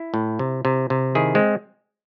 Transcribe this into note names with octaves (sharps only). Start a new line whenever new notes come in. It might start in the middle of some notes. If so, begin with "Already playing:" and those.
Already playing: E4
A2
C3
C3
C3
D#3 E4 G#4
G#3 C4